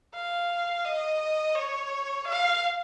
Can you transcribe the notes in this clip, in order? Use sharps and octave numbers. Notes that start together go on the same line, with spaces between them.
F5
D#5
C#5
F5